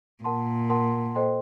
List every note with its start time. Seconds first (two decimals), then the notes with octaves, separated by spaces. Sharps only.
0.24 A#2 A#4 F#5 A5 C6
0.70 A#4 F#5 A5 C6
1.15 A4 C5 D#5 G5 C6